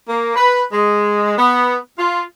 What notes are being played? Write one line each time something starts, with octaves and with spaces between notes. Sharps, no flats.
A#3
B4
G#3
B3
F4